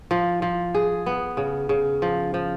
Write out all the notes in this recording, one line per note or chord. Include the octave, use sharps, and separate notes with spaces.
F3
F3
G#4
B3
C#3
C#3
F3
F3